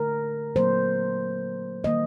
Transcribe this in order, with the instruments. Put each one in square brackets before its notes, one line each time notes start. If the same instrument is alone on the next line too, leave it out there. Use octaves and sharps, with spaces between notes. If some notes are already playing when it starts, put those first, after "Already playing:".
Already playing: [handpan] D3 A3 A#4
A#2 F#3 A#3 C5
D#3 G3 A#3 D#5